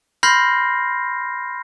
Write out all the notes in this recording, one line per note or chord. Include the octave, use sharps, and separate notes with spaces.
B5 C6 F6 G6 A#6 C7